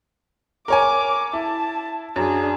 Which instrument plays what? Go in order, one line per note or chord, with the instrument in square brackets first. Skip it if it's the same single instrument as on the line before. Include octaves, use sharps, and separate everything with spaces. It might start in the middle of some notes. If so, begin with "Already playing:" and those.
[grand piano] A#4 C#5 G#5 [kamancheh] D6
[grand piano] E4 [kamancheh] A5
[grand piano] F#2 [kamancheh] D4 G#4